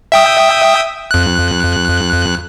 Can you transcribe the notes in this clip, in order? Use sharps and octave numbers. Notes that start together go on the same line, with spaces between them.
E5 G5 D#6
F2 F#6